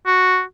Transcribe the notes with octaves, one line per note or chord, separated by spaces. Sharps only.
F#4